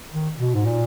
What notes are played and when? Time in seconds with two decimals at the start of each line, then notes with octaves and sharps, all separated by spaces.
0.11 D#3
0.38 B2
0.54 G#2
0.66 A#2